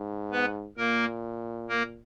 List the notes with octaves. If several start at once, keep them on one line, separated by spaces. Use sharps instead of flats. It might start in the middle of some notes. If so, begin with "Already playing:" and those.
Already playing: G#2
B3 B4
A#2 A#3 A#4
A#3 A#4